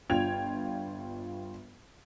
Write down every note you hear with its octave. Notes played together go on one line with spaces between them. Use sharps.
G1 D4 F4 G5 G#6 F7